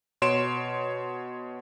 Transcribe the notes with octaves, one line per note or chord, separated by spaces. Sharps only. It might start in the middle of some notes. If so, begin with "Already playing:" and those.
B2 C#5 C6 D7 E7